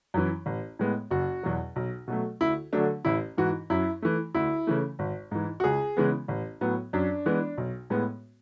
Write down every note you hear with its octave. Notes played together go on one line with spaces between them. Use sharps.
F#2 E3
A1
A2 G#3 B3
F#1 F#4
E2 B2 F#3
B1
B2 F#3 A3
D2 E4
D3 F#3 A3 D4
A1 E4
G#2 E3 F#4
F#2 E4
E3 A3
D2 E4
C#3 E3 A3
G#1
G#2 E3
F#4
C#2 G#4
C#3 E3 G#3 B3
A1
A2 F#3 B3
F#2 D4
E3 G#3 B3
B1
A2 G#3 B3